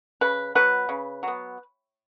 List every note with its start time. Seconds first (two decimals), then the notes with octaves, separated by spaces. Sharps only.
0.21 C#3 B4
0.55 F#3 B3 B4
0.89 C#3
1.23 F#3 B3